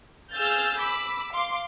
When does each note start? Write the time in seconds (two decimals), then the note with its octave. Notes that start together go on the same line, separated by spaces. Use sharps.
0.33 G#4 F5 E6 F6 G6 A6
0.78 B5 D6 E6 B6
1.32 F5 C6 D6